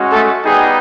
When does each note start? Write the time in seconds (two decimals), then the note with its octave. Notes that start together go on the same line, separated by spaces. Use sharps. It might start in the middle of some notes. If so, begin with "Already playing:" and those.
Already playing: G#3 C#4 F#4
0.11 A3 A4
0.45 G3 B3 D#4 G4 G#4